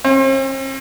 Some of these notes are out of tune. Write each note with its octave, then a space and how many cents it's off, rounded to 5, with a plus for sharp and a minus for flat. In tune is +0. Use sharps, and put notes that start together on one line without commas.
C4 +45